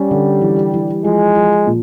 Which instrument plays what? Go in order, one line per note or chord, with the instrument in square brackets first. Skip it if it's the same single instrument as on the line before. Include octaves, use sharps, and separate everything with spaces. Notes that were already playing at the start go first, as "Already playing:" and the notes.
Already playing: [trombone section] G3 [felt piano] C#4
[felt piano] D3
E3
E3
[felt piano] F3 [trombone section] G#3
[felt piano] F3
A#2